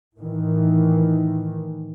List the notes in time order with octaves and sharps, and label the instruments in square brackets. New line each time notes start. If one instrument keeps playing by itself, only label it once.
[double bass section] A2 D#3 E3